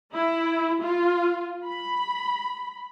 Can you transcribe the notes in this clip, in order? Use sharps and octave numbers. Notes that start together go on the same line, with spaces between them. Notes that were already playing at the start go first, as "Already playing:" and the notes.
E4
F4
B5